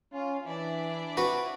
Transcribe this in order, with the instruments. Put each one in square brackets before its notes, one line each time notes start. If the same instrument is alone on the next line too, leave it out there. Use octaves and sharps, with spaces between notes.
[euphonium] C#4 [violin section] F4
[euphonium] E3 [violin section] D4 E4 D5
[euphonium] C4 [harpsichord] F#4 [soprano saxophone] B4